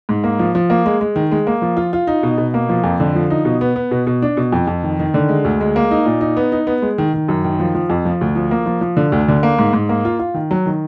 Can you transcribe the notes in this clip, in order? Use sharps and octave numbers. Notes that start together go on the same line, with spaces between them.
G#2
A#3
F3
F3
A#3
G#3
G#3
D#3
G#3
A#3
F3
F4
F4
D#4
B2
B2
A#3
F3
F2
D3
F3
D#4
B2
B3
B3
B2
B2
D4
B2
F2
F2
D#3
D#3
D3
G#3
D2
G#3
A#3
D#4
A#2
D#4
B3
D#4
B3
G#3
D#3
D#3
F#2
D#3
F3
F3
F2
F3
D2
F3
A#3
F3
F3
D3
D2
D3
A#3
G#2
G#2
A#3
F4
F4
D#3
F#3
D#3